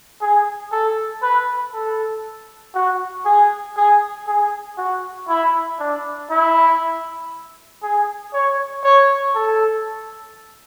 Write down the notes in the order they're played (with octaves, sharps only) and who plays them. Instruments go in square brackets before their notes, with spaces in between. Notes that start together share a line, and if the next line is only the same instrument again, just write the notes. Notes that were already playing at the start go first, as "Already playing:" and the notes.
[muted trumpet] G#4
A4
B4
A4
F#4
G#4
G#4
G#4
F#4
E4
D4
E4
G#4
C#5
C#5
A4